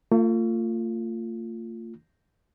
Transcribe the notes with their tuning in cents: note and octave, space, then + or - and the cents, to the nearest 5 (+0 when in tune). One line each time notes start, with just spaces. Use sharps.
A3 +45 F4 +0